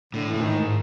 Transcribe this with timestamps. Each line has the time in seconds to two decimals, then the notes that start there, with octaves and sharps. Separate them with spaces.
0.13 A2 D3
0.29 E3
0.34 A2
0.41 D#3
0.54 G#2